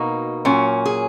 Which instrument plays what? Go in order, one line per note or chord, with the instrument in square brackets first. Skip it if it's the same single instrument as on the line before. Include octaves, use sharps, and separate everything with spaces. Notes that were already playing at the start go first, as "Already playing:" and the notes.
Already playing: [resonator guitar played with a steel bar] B2 A#3 D#4 F#4
A#2 F#3 C#4
G#4